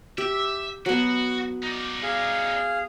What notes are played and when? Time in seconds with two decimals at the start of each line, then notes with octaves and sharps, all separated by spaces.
0.18 G4 E5
0.86 F#3 B3 F#4
1.63 D#4 D5
2.03 G#4 F5